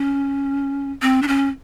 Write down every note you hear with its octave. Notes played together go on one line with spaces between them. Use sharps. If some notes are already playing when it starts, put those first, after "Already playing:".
Already playing: C#4
C4
D4
C#4